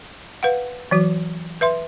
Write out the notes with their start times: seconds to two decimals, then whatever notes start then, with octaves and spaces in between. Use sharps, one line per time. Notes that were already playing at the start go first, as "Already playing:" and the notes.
0.43 B4 F5 F#5
0.91 E3 F#3 F#4
1.61 B4 E5 C6